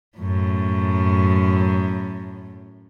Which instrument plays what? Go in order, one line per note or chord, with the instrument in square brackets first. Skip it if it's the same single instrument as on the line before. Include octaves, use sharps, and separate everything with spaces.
[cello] F#2 A2